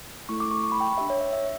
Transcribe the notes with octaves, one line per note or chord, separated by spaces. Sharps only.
A3 E4 A4 C#6
D6
C#6
C#6
B5
G5
D4 G4 E5
C#5
E5
E5